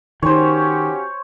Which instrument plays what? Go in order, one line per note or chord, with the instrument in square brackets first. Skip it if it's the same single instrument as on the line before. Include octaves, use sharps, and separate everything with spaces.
[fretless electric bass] D#3 [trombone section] C#4 F#4 G4 [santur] C5 C#5